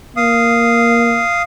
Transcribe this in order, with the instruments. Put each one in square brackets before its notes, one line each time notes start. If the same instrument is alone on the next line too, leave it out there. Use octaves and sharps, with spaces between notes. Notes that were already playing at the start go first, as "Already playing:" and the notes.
[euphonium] A#3 [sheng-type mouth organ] F5 D#6